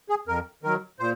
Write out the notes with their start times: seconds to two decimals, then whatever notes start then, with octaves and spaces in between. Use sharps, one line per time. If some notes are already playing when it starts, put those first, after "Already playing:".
0.09 G#4
0.27 F2 A#4
0.63 D#3 F#3 A#4
1.00 A#2 C5